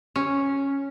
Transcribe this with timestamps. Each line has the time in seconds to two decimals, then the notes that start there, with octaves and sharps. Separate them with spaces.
0.16 C#4